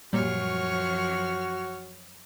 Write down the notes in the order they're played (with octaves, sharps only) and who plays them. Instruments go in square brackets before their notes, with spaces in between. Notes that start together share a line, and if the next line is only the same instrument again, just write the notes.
[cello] F#2 F3 [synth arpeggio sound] A#2 G3 [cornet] F#4 [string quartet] C#5 F6